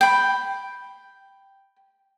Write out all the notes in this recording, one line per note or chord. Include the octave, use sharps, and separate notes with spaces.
G5 B5